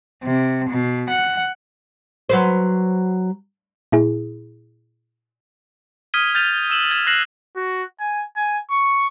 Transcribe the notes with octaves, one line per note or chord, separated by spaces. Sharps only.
C3
B2
F#5
F#3 B4 C5
A#2 E4 G#4
D#6 F6 G#6 B6 D#7 G7
F6 G6 A6 D#7 F7
E6 E7 F#7
G#6 A6 E7
F6 F#6 A#6 C7 E7 F#7
F#4
G#5
G#5
C#6